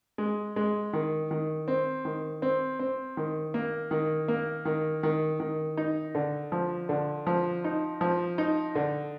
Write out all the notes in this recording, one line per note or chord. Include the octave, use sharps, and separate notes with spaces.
G#3
G#3
D#3
D#3
C4
D#3
C4
C4
D#3
A#3
D#3
A#3
D#3
D#3
D#3
D#4
D3
F3
D3
F3
D#4
F3
D#4
D3